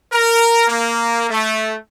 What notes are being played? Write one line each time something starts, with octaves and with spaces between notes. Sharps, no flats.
A#4
A#3
A3